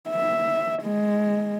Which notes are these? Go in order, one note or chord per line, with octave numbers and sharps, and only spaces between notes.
E5
G#3